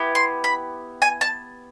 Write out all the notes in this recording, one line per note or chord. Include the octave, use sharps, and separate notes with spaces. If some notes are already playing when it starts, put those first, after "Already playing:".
Already playing: B3 E4 G4
C6
B5
G#5
A5